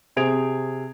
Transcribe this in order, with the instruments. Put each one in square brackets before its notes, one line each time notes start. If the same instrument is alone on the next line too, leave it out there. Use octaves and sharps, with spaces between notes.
[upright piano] C3 G#4 C5 G#6 D7 F7